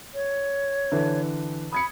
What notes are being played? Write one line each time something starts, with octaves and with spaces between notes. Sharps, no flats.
C#5
D3 E3 A4
B5 D#6 G#6 C#7